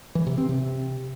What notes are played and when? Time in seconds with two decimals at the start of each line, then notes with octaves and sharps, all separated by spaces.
0.15 E3
0.27 C3
0.38 C4
0.49 C3